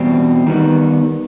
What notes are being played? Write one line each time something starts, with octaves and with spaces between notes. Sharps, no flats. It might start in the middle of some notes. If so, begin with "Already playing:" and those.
Already playing: E2 B2 G3 C4
D#3 G3 B3